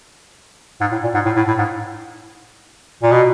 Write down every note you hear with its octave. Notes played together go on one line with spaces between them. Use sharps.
G#2
A2
A#2
G#2
A2
A2
A2
G#2
A#2
B2